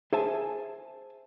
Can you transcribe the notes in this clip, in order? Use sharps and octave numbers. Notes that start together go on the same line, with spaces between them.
G#4 C5 E5 G#5 A5